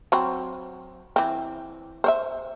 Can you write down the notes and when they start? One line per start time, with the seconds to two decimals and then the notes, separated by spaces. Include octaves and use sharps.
0.12 F#3 C4 B5
1.16 E3 C4
2.04 C5 C#5 E5